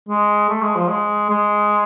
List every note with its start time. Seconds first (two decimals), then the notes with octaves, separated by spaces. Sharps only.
0.09 G#3
0.49 A3
0.62 G#3
0.76 F3
0.89 G#3
1.29 G#3